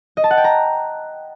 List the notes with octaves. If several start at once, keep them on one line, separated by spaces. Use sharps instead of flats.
D#5
A5
F#5
G5
A#5